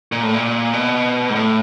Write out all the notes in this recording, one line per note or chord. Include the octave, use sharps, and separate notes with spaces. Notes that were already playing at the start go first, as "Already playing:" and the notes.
A#2
A2
A#2
B2
G#2
A2